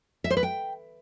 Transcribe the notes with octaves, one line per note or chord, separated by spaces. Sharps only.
E5
C5
B4
G5